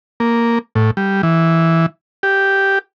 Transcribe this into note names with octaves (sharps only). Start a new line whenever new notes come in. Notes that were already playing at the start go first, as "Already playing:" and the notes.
A#3
A2
G3
E3
G4